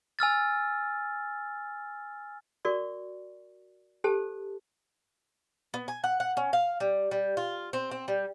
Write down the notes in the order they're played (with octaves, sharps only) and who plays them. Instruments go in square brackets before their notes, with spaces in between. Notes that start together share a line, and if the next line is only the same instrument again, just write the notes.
[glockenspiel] G#5 E6 F6 A6
[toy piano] F#4 A#4 D5 C#6
G4 A4 C5 A5
[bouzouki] B3
G#5
F#5
F#5
C#4
F5
G3
G3
F4
C4
C4
G3